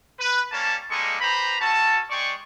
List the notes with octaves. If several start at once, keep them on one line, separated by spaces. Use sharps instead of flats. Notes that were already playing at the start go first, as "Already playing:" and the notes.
B4
G3 A#3 C#4 A5
G3 G#3 A#3 D#4 A4 C#6
G4 B4 C5 A#5 B5
C#4 F#4 A4 A5
G#3 D5 G5 C#6